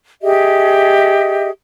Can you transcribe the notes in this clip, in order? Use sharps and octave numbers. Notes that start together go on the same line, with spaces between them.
G4 G#4 D#5 E5